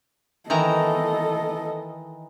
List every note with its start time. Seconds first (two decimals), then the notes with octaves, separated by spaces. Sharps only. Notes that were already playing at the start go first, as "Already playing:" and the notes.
0.50 D#3 E3 A4 D#5 A#5